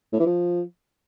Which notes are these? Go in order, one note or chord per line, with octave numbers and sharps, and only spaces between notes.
A2
E3
F3